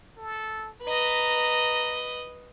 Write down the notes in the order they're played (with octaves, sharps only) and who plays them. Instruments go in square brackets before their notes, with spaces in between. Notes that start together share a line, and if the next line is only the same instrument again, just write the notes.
[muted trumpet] A4
[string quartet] B4 D#5 [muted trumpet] A#5